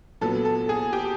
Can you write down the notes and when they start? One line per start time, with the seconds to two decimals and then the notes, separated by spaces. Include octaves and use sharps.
0.21 A#2 F#3 B3 A4
0.45 A4
0.69 G#4
0.93 G4